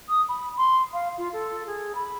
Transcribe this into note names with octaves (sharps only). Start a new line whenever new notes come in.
D#6
B5
C6
F5
F4
A4
G#4
B5